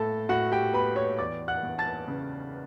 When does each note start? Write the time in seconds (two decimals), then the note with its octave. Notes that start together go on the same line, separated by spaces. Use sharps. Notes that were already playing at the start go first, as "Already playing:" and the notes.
Already playing: A2 A4 A5
0.29 A2 F#4 F#5
0.52 G4 G5
0.74 B3 B4 B5
0.96 C#5 C#6
1.18 E2 D5 D6
1.48 F#5 F#6
1.63 E2
1.79 A5 A6
2.08 C#3